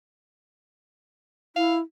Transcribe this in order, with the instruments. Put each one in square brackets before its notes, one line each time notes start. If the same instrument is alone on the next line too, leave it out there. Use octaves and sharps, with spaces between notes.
[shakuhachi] E4 [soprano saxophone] F5